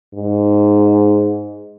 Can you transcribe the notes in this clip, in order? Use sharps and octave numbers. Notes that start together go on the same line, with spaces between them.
G#2